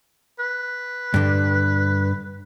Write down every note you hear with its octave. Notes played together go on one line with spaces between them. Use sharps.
B4
G2 D3